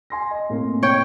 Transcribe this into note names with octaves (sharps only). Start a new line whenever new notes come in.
G#5 C6 A#6
D#5
A2 A#3 C4
C#5 G5